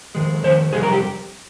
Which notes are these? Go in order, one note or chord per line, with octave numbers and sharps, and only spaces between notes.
F2 D#3 G#3
F2 D#3 C5
F2 C3 G3 G#4
A#4
G4